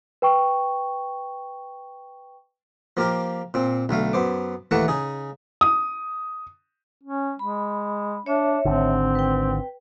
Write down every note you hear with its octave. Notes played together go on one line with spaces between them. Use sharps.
B4 G5 C#6
F3 A#3 F4 G4 A#4
A#2 C4
B1 D3 A3 F5
F#2 B3 C5 D6
D#2 E3 A3 A#3 F#5 A5
C#3 D#4 G#4
D#6
C#4
G#3 B5
D4 C#5 E5
G#1 D3 C4
B4 G5